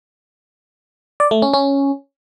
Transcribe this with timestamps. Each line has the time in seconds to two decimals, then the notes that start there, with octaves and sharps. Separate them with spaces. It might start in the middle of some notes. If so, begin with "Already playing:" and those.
1.20 D5
1.31 A3
1.42 C#4
1.54 C#4